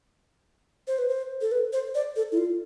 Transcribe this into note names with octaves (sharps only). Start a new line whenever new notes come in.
C5
B4
C5
A4
B4
C5
D5
A4
E4
F4